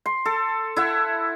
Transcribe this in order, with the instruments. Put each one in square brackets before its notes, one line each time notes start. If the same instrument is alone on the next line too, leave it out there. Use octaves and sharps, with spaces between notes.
[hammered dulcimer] C6
A4
E4 E5 F#5